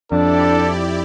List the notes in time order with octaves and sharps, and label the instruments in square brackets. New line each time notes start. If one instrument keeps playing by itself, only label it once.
[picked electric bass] F2 [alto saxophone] D4 [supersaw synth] E4 G4 D5 [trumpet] A4